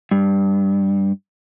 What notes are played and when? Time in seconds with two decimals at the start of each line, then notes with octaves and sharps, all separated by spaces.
0.11 G2